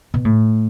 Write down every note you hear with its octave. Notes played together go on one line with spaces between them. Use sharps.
B2
A2